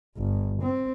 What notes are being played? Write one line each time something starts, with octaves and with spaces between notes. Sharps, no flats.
G1
C4